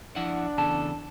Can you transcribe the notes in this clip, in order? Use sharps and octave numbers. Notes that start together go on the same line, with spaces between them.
F3 D4 E4 F#5
E2 C#3 A4 A5